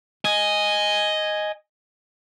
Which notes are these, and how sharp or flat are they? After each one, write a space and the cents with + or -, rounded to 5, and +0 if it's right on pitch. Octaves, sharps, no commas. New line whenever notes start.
D#5 +0 G#5 +0